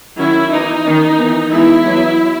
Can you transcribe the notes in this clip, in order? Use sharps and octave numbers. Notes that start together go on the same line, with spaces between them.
D#3 F#3 C#4 E4
E3 B3 D#4
D#3 A#3 C#4
E3 B3
E3 G#3 B3 E4
F#3 B3